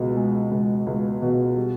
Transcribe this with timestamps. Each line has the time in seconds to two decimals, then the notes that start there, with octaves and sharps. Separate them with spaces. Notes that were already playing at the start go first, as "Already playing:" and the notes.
Already playing: C#2 B2 G#3
0.17 G#3
0.51 C#2
0.87 C#2
1.22 B2
1.56 G3